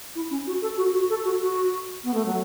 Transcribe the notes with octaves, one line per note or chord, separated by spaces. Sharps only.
E4
C#4
F#4
A4
F#4
F#4
A4
F#4
F#4
B3
A3
F#3